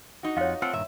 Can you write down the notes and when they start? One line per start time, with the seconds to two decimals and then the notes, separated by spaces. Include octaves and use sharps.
0.23 D#4 F#4
0.37 F2 F4 C#5 F5 F#5
0.62 A3 C4 F4 F#5
0.73 G2 A#2 D#3 E5